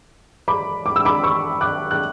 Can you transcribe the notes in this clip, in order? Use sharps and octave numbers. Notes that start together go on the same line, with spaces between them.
B5 D6
D6
E6
B5 D6
C#6 E6
D6 F#6
F#6